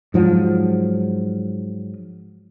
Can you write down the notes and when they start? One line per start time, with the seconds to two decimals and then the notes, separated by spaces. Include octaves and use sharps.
0.14 G#2 F3 F#3